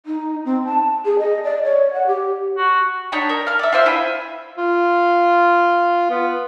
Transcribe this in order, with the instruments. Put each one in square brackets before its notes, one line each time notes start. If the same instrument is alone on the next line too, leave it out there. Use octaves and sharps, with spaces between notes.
[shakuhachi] D#4
C4
A5
G#4
D#5
D5
C#5
F#5
G4
[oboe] F#4
[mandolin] D4 D#4 C#5 B5
A#4
F5 F6
D5 E5
F4 C5 E5
E4 G#5 B5
[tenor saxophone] F4
B3